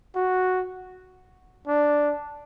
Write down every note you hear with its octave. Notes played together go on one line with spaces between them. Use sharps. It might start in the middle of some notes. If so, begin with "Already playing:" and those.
F#4
D4